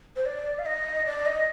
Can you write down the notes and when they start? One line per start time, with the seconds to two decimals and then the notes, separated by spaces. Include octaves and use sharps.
0.16 C5
0.26 D5
0.59 F5
0.66 D#5
1.06 D5
1.26 D#5